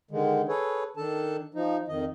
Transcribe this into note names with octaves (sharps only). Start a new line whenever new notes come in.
D3 D#3 G#3
G#4 A4 B4 C#5
D#3 D4 A4 A5
F3 D#4
F2 D#3 D#5